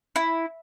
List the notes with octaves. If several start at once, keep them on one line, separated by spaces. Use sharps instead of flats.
E4